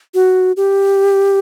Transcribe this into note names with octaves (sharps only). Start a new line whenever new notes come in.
F#4
G4